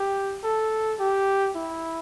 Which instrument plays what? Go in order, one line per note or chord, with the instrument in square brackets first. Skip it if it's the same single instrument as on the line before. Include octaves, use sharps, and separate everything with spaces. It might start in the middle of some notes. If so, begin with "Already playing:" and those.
Already playing: [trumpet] G4
A4
G4
E4